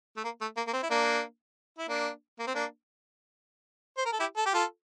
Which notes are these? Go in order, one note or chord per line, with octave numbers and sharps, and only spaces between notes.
A3
A#3
A3
A#3
A#3
C4
E4
A#3 D4
E4
A#3 D4
A#3
C4
A#3 D4
C5
A#4
A4
E4 G4
A4
G4
F4 A4